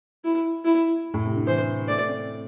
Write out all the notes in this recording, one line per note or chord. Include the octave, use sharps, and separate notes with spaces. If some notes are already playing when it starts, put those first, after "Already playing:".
E4
E4
A2
C3
D3
E3 C5
A3 D5
C4